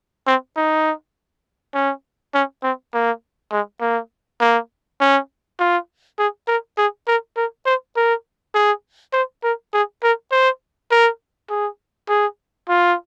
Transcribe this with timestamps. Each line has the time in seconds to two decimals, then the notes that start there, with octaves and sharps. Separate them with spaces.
0.27 C4
0.56 D#4
1.74 C#4
2.34 C#4
2.63 C4
2.93 A#3
3.52 G#3
3.81 A#3
4.40 A#3
5.00 C#4
5.59 F4
6.18 G#4
6.48 A#4
6.78 G#4
7.07 A#4
7.36 A#4
7.65 C5
7.96 A#4
8.54 G#4
9.13 C5
9.43 A#4
9.73 G#4
10.03 A#4
10.31 C5
10.91 A#4
11.50 G#4
12.09 G#4
12.68 F4